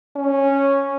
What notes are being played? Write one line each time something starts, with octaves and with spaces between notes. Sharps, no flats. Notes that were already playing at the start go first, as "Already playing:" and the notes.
C#4